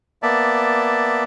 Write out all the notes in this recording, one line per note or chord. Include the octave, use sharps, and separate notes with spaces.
A#3 B3 D5 E5 A5